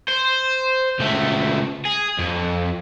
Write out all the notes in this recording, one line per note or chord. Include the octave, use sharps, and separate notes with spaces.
C5
C#2 A3
G#4
F2